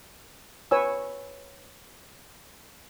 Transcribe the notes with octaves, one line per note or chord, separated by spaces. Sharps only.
B4 C#5 G#5 E6